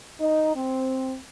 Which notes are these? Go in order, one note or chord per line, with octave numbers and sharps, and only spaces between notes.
D#4
C4